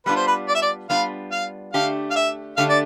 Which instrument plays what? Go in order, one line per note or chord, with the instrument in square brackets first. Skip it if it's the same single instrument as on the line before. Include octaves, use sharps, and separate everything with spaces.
[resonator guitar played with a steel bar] G3 B3 D4 F4 [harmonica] B4
[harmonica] C5
B4
D5
E5
D5
[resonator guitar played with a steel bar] G3 B3 D4 F4 [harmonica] F5
[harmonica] F5
[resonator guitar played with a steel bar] D3 A3 D4 G4 [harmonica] F5
[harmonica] F5
E5
[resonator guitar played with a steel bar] D3 A3 D4 G4 [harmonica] F5
[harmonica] D5